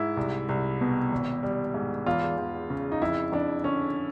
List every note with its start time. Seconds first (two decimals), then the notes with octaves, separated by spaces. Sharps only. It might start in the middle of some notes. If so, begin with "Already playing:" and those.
Already playing: G#2 E4
0.17 C2
0.49 C2
0.81 B2
1.12 G#1
1.43 G3
1.74 G#2
2.06 E2 F4
2.38 E2
2.70 C#3
2.92 D#4
3.02 F2 E4
3.32 F2 D4
3.64 D3 C#4